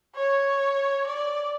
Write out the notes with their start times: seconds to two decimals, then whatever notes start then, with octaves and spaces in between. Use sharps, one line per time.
0.15 C#5
1.06 D5